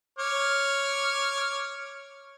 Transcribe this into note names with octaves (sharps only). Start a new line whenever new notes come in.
C#5 D6 F6